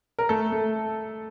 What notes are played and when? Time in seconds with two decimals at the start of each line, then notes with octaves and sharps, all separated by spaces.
0.19 A#4
0.29 A3 A4
0.52 A3